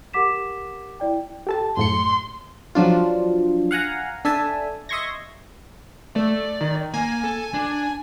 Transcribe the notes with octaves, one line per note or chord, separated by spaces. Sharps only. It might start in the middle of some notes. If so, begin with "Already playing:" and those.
G4 A#4 F#5 D6 B6 E7
E4 D5 G5
G4 A4 A5
F#2 A2 C6 C#7
F3 F#3 D4 F4
F5 F#5 G#5 A#5
D4 A4 E5 G#5 A5
D#5 E5 C6 C#6 G#6 A#6
A3 D5
D#3
A#3 G#5
A4
D4